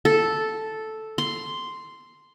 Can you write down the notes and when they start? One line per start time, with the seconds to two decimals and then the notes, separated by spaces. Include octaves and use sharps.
0.05 A4
1.18 C6